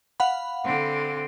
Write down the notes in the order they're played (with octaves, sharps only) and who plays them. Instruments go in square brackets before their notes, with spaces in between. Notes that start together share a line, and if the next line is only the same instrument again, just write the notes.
[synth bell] F5 F#5 B5
[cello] D3 C4